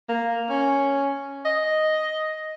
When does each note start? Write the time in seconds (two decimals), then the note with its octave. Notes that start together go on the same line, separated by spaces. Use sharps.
0.09 A#3
0.50 C#4
1.45 D#5